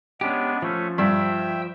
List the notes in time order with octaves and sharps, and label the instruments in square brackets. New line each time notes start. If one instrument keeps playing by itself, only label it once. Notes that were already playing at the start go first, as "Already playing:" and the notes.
[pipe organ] G#3 B3 D4 [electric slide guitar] C#4 G4
[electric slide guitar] F3 [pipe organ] A3 C#4
[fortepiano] G2 [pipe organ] E5 G5 E6